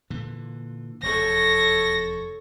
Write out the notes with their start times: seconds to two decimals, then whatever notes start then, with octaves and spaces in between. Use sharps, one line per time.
0.10 A#2 D3 E3
1.03 F1 E2 A4 C#5 A#6